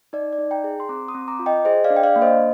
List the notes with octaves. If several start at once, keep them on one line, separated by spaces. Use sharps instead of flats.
D#4 D5
D5
D#4
G5 A#5
G#4
C6
C4 A#5 D6
C6 D#6
C4
A#5 D6
F4
D#5 G5
G#4 C5 D#5
D5 F5
D4
G5
D5 F5
A#3
C5 D#5